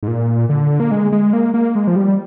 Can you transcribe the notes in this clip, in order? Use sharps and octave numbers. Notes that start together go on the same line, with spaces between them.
G#2
A#2
D3
A#3
G#3
G#3
A#3
A#3
G#3
F3
G3